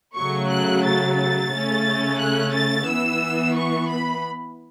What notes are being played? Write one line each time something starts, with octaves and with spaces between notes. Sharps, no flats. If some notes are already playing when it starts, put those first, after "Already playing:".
C#3 F#3 A3 C#6
F#6
A6
A6
C#3 A3 C#4
F#6
A6
E3 B3 E6
C#6
B5